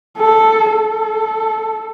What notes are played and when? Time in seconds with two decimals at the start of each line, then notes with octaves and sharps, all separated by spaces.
0.19 A4
0.73 A4